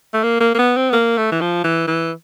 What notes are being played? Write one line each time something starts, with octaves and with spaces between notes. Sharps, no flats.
A3
A#3
A#3
A#3
B3
C4
B3
A#3
A3
E3
F3
E3
E3